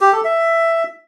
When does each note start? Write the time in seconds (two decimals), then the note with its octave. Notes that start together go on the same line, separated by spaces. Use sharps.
0.01 G4
0.13 A4
0.24 E5